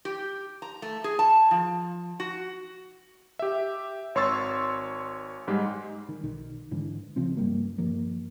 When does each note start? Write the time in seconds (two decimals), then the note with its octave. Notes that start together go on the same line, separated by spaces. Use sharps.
0.05 G4
0.62 A#5
0.82 A3
1.04 G#4
1.19 A5
1.51 F3
2.20 F#4
3.39 G4 E5
4.15 G#1 C#5 C6 C#6 E6 A6
5.48 G#2 G3 G#3
6.09 D#3
6.23 B1 D#3
6.71 G#2 D3 E3
7.16 C#2 C#3 F3 C4
7.37 G2 G3 A#3
7.78 G2 D#3 F3 A#3